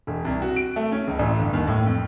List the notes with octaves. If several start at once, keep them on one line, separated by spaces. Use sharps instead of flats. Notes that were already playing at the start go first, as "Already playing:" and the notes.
E1
C2
F#4
D7
A3
C#4
C#2
A1
G1
D#2
A2
F2